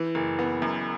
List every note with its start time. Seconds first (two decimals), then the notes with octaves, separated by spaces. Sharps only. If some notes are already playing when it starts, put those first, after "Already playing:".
Already playing: E3
0.15 F#1
0.39 B3
0.62 F#2